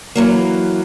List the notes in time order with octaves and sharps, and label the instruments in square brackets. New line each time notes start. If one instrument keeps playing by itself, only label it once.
[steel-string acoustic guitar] E3 F#3 A#3